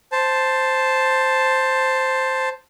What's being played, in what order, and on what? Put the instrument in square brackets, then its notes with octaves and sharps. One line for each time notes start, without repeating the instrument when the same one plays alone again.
[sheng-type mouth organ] C5 A5